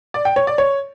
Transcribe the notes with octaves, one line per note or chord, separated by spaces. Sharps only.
D5
G5
C#5
D5
C#5